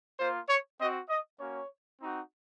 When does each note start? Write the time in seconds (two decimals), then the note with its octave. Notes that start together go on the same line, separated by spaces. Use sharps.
0.18 A#3 F4 C5
0.48 C#5
0.78 C4 F#4 D#5
1.09 D#5
1.38 A#3 C#4 F#4 C#5
1.99 C4 D#4 F#4